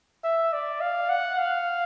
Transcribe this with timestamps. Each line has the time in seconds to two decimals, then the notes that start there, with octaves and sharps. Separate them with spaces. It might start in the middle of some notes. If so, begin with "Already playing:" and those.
0.24 E5
0.53 D5
0.81 F5
1.10 F#5
1.38 F5